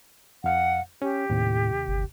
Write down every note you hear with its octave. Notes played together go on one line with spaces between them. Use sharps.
F2 F5 F#5
C#4 G4
D#2 A2 C3
G1